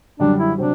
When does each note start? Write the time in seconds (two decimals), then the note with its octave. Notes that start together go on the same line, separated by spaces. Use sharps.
0.20 F#2 D3 G3 D4
0.38 E4
0.58 C3 F#3 C4 D4